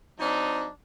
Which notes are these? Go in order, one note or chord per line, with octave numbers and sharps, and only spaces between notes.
F#3 C4 D4 D#4